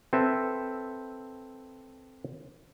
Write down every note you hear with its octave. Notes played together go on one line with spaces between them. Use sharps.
C4 A4 B4 E5